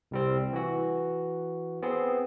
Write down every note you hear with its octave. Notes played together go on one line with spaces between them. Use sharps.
C2 G3 C4
E3 F#4
B3 C4 G#4